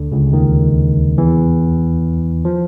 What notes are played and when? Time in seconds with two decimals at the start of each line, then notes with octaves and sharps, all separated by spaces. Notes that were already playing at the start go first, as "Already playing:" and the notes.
Already playing: D2 D3
0.12 C#2 C#3
0.32 D#2 D#3
1.18 E2 E3
2.45 F3